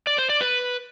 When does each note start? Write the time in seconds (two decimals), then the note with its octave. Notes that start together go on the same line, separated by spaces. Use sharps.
0.07 D5
0.18 C5
0.29 D5
0.41 B4